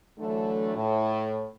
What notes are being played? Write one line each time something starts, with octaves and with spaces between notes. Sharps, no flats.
D3 E3 F#3 A3
A2